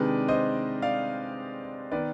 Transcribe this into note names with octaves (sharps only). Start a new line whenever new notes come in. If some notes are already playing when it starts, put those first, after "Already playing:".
Already playing: C3 D#3 G#3 D4 B4 D5
C5 D#5
D5 F5
D#3 B3 B4 D5